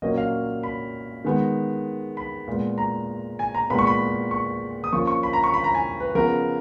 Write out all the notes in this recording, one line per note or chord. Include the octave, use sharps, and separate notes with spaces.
A#2 F#3 A#3 C#4 D#5
F5
B5
D#3 G#3 B3
B5
A#2 G#3 B3
A#5
G#5
A#5
A#2 G#3 B3 B5
C#6
B5
C#6
D#6
F3 A#3 C#4 C#6
C#6
B5
A#5
C#6
B5
A#5
G#5
B4
C#3 F3 B3 A#4